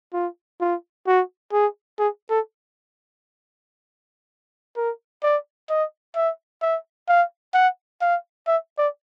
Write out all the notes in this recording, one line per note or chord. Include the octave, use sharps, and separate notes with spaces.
F4
F4
F#4
G#4
G#4
A4
A#4
D5
D#5
E5
E5
F5
F#5
F5
E5
D5